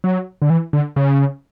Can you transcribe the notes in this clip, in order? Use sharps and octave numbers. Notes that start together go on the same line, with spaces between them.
F#3
D3
E3
D3
C#3